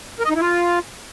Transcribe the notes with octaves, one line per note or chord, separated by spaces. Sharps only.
A#4
D#5
D#4
E4
F4